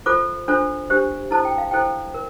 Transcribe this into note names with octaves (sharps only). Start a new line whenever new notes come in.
F4 A4 C5 D6
D4 F4 A4 C5
D4 G4 C5
E4 A4 C5 A5
G5
F5
E4 A4 C5 G5
A#4